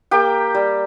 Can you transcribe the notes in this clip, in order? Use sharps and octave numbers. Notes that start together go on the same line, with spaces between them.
A#3 G4 G5
G3